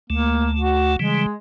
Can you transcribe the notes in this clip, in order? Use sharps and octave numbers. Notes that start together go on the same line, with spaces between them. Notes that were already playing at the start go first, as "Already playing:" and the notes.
D2 A3 A#3
F#4
C#3 E3 G3 G#3